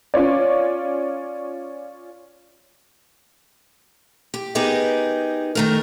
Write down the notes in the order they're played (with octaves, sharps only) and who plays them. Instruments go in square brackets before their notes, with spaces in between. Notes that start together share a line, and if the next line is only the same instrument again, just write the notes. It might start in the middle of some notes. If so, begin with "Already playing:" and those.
[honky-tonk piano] C#4 F4 C#5 D5
[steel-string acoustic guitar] G4
B3 D#4 G4 G#4 A#4
D#3 A3 A#4